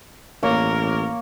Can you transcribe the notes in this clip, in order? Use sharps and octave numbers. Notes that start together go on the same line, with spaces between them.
A1 A#3 A#4 C#5